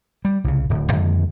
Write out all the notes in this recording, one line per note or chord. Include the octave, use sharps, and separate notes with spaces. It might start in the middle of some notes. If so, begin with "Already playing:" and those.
G3
C2 C#3
D1
F2 D3 D#3 G#3